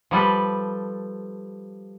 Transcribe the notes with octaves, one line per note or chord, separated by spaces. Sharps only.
F3 G3 A4 B4